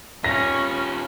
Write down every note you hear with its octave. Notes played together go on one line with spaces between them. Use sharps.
G3 C#4 F4 A#6